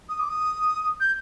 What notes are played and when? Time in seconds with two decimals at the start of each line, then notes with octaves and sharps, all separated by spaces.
0.09 D#6
0.20 D6
0.29 D#6
1.00 G6